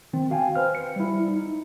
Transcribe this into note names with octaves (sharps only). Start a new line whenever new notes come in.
D#3 C4
F#4 F5 G5 G#5
B4 C5 F6
C#7
G3 E4
D#4